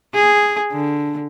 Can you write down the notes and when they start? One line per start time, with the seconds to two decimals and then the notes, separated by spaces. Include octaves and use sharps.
0.14 G#4
0.72 D3